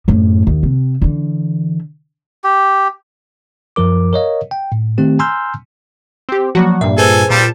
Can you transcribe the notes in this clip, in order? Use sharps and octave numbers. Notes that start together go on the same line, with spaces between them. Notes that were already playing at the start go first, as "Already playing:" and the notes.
F#2 A2
D#2
C3
D3 E3
G4
F#2 F3 A#4 D6
A#4 C#5 D#5 F5
G5
A2
D#3 A3 C4 G4
G#5 A#5 C6 E6 F6 G6
C4 G4
F3 F#3 A#3 F#4
G2 A#2 E5
G#4 A4 B4 C5 G#5
A#2 G3 C4 A5